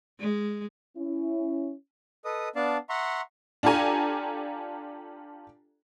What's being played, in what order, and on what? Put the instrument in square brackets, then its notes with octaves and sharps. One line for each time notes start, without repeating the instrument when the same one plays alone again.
[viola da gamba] G#3
[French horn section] C#4 E4
[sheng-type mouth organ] A4 B4 D#5 D#6
B3 D4 D5 F5 A5
E5 F#5 A#5 C6 C#6
[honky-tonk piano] D4 F4 G4 A4 G#5 A#5